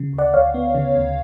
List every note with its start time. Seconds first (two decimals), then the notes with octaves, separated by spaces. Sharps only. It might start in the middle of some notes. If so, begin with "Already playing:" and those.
Already playing: C#3
0.13 D2
0.18 D5 F#5
0.34 D2 C#5 F5
0.54 B3
0.75 C#3
0.96 D2